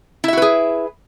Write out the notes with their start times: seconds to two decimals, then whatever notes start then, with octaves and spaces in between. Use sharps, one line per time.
0.24 E4
0.28 E5
0.33 F#4
0.37 B4
0.42 G#4